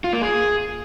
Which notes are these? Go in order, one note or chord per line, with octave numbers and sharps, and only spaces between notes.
F4
A#3
G#4